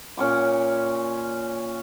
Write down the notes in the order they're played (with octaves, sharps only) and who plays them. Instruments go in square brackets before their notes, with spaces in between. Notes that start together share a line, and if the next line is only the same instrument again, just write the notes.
[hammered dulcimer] A#2 C#4 C#6 D6